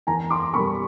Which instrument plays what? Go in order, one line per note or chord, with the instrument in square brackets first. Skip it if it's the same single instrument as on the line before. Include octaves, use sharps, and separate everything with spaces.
[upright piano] E2 G#5 A#5
C6 D6
B2 G3 B5 C#6